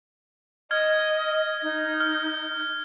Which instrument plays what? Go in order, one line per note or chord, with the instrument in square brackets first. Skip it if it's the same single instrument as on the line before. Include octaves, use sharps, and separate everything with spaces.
[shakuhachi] D#5 [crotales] F6 G#6
[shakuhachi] D#4
[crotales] F6